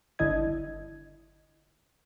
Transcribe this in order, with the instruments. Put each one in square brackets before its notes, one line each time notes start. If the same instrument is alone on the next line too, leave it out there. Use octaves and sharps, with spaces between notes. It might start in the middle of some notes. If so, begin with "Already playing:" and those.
[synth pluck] G1 D3 E4 D#5 G#6